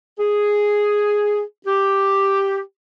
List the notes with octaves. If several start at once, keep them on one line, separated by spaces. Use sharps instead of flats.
G#4
G4